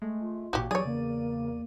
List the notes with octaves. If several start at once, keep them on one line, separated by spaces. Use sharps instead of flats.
G#3 A3
F4
A1 A#2 F#4 G4
E2 F#3 G4 G#4 C#5 D5 D#7
C#3 A#3